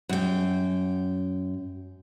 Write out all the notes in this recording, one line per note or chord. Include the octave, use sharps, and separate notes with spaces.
F#2 G5